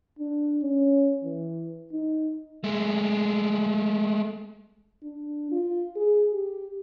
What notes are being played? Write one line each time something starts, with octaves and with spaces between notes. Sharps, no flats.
D4
C#4
E3
D#4
G#3 A3
D4
F4
G#4
G4